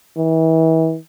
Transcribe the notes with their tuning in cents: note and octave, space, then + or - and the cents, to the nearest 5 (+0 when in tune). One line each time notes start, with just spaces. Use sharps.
E3 -35